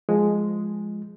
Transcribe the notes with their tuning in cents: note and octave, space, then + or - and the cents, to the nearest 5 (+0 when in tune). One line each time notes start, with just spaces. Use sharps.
F3 +0 G#3 +0